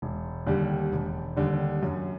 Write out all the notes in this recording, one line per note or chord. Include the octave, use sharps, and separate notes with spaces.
E1
D#2 D3 G3
E1
D#2 D3 G3
F#2